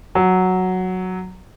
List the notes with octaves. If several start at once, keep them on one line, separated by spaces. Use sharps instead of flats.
F#3